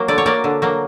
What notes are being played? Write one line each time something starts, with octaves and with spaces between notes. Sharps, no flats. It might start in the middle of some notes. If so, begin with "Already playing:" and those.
Already playing: F#3 A#3
D3 D5
C#5
F#3 A#3 D5
D3
F#3 A#3